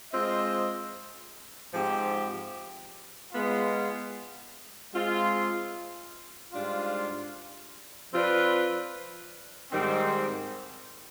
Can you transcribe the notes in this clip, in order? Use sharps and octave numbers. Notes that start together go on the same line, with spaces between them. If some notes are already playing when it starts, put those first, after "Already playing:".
G#3 C4 F4 C5 D#5
G#2 F3 C4 G4
G#3 B3 F4
G#3 C4 F4
G#2 G3 D4 F4
F3 C4 F4 B4 D5
G#2 D#3 G3 C4